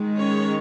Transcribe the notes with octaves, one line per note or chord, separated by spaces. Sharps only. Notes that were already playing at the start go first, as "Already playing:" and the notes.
Already playing: D#3 G#3
C#4 C#5